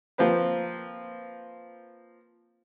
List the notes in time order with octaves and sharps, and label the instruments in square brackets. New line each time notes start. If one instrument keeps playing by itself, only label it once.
[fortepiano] F3 A#3 C4 B4